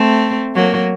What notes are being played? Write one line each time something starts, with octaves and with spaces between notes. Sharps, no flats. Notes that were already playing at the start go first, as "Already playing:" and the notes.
Already playing: A3 C4
F#3 A#3